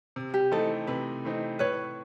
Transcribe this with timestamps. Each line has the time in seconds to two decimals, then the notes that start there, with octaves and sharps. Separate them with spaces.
0.16 C3
0.34 G4
0.51 E3 A3 C4 D#4 A4
0.87 C3 B4
1.24 E3 A3 C4 D#4
1.59 A2 B4 C#5